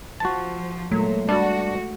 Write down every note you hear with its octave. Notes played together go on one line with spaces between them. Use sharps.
F3 F#4 A5
A#2 F#3 G#3 A3
G3 D4 F#4 D5